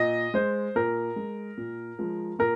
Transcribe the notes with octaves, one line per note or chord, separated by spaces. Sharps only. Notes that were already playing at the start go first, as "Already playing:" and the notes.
Already playing: A#2 D#5
G#3 C5
A#2 A#4
G#3
A#2
F3 G#3
A#2 A#4